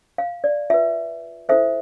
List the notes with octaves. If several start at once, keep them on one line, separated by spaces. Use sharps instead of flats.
F5
D5
F4 B4 E5
E4 A4 C5 E5